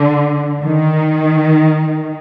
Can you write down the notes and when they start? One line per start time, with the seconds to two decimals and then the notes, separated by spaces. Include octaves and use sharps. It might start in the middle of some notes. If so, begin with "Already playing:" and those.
Already playing: D3
0.62 D#3